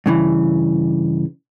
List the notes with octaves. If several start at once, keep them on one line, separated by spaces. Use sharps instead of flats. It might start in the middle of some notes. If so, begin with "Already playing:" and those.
G2 C#3 E3